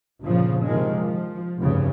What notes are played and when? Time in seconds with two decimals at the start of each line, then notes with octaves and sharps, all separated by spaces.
0.22 G1 A#2 C#3 F3
0.66 C3 D#3 F3 G#3
1.04 F3
1.59 F1 D2 G2 C#3